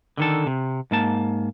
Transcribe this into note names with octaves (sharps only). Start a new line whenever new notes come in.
D3 D#3 A4
C3
G#2 A#3 A5